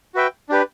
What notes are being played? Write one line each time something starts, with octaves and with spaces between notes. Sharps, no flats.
F#4 B4 E5 G5
D4 G4 B4